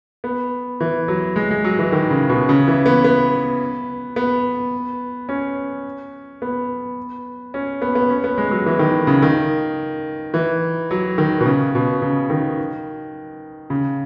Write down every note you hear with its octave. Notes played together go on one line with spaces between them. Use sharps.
B3
E3
F#3
G#3
G#3
F#3
E3
D#3
C#3
B2
C#3
E3
B3
B3
B3
C#4
B3
C#4
B3
B3
C#4
B3
G#3
F#3
E3
D#3
C#3
D#3
E3
F#3
D#3
B2
C#3
B2
C#3
D#3
C#3